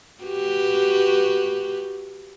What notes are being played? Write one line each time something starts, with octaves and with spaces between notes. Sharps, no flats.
F#4 G4 B4